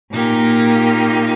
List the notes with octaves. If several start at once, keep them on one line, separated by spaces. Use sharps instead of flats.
A#2 A#3 D#4 G4